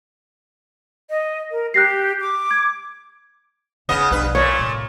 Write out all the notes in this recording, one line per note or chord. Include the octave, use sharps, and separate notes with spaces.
D#5
A#4
G4 F#6 A#6 C7
D6
G#6
D2 C#3 A3 B3 D#5
B1 G2 F3 B4
F2 A#2 A3 C#5
C2 A2